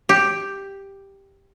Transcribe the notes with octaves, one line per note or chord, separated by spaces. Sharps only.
G4